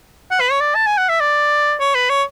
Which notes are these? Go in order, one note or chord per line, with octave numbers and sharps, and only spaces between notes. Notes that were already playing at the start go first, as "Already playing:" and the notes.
F#5
B4
C#5
D5
A5
G#5
F#5
E5
D5
C#5
B4
C#5